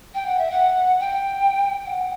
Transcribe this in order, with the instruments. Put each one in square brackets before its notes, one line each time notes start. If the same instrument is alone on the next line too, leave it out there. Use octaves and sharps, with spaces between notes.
[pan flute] G5
F#5
E5
F#5
G5
F#5